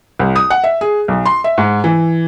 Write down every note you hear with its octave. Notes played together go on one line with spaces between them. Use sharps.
C2
D#6
F#5
E5
G#4
B1
C6
E5
G#2
E3